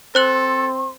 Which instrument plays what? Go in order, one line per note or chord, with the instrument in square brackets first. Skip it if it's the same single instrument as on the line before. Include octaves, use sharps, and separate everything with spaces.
[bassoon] C4 [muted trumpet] A4 [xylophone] C5 F#6 F#7 [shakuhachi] C6